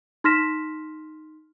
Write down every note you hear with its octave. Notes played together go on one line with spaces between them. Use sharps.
D#4 C6 F6 A#6 B6 E7